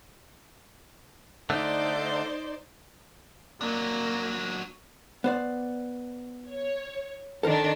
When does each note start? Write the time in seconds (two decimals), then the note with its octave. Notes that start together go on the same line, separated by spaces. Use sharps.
1.50 D3 A3 D#4 C5 D5
3.61 F#3 A#3 D4 A#6
5.24 B3 C5 D5
6.49 C#5
7.43 D#3 D4 A4 A#4 C5